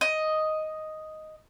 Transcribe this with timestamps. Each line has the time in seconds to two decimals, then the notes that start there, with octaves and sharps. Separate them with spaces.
0.01 D#5